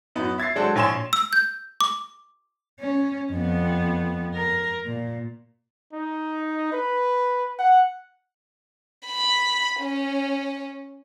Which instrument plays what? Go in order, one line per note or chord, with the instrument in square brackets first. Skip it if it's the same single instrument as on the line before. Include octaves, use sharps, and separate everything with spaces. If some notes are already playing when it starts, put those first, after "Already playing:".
[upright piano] F#2 B3 D#4
E5 G#6 A6 C7
F#3 G#3 D4 F#4 A4 C5
A#1 C#5 G#5 C6 E7
[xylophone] E6
G6
D6
[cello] C#4
F2 B3
A#4
A#2
[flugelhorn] D#4
B4
F#5
[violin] B5
C#4